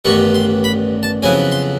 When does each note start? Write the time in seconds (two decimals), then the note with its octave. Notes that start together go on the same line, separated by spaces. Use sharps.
0.05 A1 G2 D#3 G3 B3 C#6
0.34 C6
0.64 B5
1.03 A5
1.22 F2 C#3 F#3 B3 E4 G#5
1.52 C6